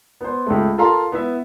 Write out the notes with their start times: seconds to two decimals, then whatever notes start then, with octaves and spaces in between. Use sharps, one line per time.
0.21 B3 C5
0.46 C#2 A3
0.78 F4 A4 A#4 F5 A#5 C6
1.12 B3 E4 E5